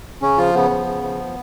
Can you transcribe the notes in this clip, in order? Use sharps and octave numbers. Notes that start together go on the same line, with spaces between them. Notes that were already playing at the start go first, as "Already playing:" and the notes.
C#3 C#4
F3 F4
C#3 B3
F3
C#3
F3